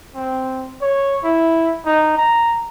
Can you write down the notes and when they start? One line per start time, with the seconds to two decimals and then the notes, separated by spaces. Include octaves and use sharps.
0.15 C4
0.81 C#5
1.23 E4
1.85 D#4
2.17 A#5